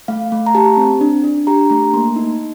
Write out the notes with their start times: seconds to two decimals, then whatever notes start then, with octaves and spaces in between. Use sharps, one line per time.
0.08 A3 F5
0.32 A3
0.46 A#5
0.55 G4 A5
0.77 C4
1.01 D4
1.24 D4
1.47 G4 A#5
1.70 A3 A#5
1.93 A#3 C6
2.16 D#4